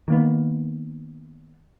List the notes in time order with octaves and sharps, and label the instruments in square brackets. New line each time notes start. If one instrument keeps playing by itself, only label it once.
[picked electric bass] D#3 A#3 B3